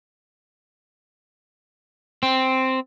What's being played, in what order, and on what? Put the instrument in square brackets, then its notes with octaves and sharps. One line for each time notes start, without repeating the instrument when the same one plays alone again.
[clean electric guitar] C4